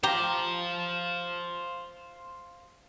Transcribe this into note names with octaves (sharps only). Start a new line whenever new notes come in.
G4 C5 F5 A#5